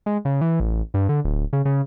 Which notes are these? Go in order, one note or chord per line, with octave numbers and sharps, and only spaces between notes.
G#3
C#3
E3
A1
G2
D3
D1
C#3
C#3